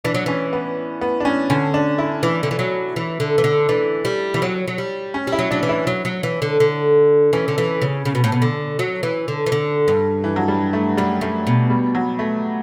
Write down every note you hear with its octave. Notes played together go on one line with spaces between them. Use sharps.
E3 D4
F#3
E3 C#4
B3
B3
D4
C#4
D3 C#4
D4
E4
E3
D3
E3
F#3
E3
D3
E3
D3
E3 D4
G3
E3
F#3
F#3
G3
C#4
G3
E4
F#3
F#3 D4
E3
E4
F#3
F#3
E3
D3
D3
E3 C#4
D3
E3
C#3
C#3
B2
A2
B2
D3
F#3
E3
D3
E3
D3
G2
E3
F#3
G3
A3
F#2 G3
F#2 A3
B2
G3
F#3
A3